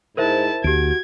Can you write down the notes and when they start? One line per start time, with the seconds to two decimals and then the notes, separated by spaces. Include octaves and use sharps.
0.17 G#2 E4 A#4 C5 E5 A5
0.64 D2 F#4 G4 G#6 D7